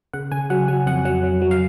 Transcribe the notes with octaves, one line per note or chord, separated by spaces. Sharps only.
C#3 F#5
C#3 G#5
F#3 F#5
F#3 G#5
F2 F#5
F#3 F#5
F#3
F#3
F5